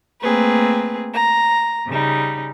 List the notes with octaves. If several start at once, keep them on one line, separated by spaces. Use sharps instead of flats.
A3 A#3 C4 G#4 B4
A#5
C#3 G3 D#4